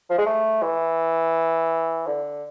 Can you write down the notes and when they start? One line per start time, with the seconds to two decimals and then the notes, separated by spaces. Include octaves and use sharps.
0.10 F3
0.18 G#3
0.26 A3
0.62 E3
2.07 D3